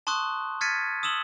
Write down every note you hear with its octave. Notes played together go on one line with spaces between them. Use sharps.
A5 C6 C#6 D#6 F#6
F6 G#6 A6 B6 C#7 D#7
D#6 E6 E7 F#7 G7